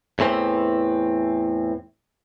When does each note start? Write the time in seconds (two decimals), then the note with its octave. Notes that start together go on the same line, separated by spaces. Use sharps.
0.19 E2 A2 E3 C4